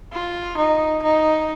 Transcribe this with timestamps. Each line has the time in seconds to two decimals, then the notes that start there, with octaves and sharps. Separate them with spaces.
0.13 F4
0.57 D#4
1.03 D#4